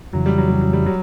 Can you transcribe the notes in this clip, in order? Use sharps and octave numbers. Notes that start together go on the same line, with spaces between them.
F2 C#3 E3 F#3
G3
F#3
G3
F#3
G3
F#3